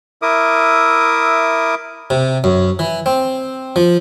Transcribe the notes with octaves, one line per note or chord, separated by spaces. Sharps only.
E4 A#4 E5 D6 D#6
C3
F#2
E3
C4
F3